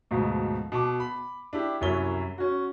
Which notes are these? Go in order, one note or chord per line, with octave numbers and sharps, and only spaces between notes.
D2 G#2 B2 F3
B2 A5 D6
B5
D4 E4 G4
C2 F#2 E4 C#5 G7
C#4 F#4